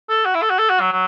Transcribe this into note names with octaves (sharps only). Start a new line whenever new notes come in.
A4
F#4
E4
A4
F#4
A4
F#4
F#3
F#3